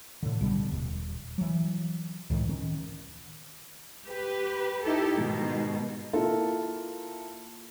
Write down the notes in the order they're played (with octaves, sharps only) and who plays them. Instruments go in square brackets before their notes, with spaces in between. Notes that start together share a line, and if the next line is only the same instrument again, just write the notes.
[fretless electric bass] A2 D3
B1 B2 D3 G3
D#1
E3 F#3
C#2 A2 D#3 E3
D#3 C#4
[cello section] G4 B4
D#4 E4 G4 A4
G#2 B2 D#3
[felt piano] A#3 E4 F4 A4 A#4